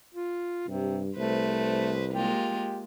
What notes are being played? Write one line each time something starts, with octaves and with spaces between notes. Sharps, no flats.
F4
G2 C3
C2 A3 B4 C5
G#3 A#3 F4 G4